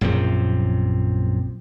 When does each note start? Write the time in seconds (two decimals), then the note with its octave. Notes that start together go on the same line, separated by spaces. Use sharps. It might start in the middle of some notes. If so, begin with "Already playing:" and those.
0.01 A#1 F#2 C3 F3